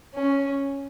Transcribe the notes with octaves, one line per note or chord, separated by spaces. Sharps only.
C#4